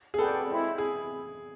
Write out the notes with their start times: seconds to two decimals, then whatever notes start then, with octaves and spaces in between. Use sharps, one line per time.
0.14 G#4
0.18 F#4 A4 B4 D5 G5
0.49 G#3 C4 E4
0.78 G#4